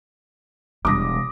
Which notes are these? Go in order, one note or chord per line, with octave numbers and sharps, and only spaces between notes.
E1 G3 D6 D#6 A#6